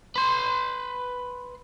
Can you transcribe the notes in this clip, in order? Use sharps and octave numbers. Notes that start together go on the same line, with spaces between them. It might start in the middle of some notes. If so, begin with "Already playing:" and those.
B4 C6